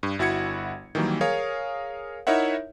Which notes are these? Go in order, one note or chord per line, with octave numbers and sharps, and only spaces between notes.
G2
G1 E4 F#4 F#5 G#6 C#7
D#3 E3 F#3 G3 A#3
G#4 A#4 C#5 F5
D#4 E4 A#4 C#5 E5 F#5